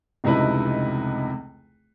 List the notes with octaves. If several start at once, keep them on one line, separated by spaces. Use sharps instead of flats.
F1 C#2 C3 D#4 E4 B4